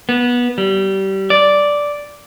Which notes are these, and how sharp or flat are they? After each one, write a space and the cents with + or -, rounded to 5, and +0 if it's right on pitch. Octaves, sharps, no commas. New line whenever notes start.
B3 -20
G3 -25
D5 -5